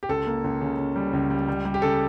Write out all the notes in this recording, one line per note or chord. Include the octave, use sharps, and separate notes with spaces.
G4
C#2 A4
A#3
C#2
C#3
C#3
G3
C#2
G3
G3
G3
G4
C#3 A4